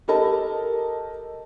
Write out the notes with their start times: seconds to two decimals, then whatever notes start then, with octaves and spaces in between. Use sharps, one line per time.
0.08 G4 A4 A#4 D#5 A5